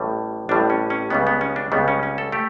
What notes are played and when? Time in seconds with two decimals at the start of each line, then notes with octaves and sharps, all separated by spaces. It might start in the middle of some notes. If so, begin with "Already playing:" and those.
Already playing: A1 A2 G3
0.49 A1 A2 G3 D4
0.70 C#4
0.90 C#4
1.10 C#2 C#3 G3 B3
1.27 B3
1.41 C#4
1.56 D4
1.72 C#2 C#3 G3 B3
1.88 C#4
2.03 C#4
2.18 A4
2.32 A3 G4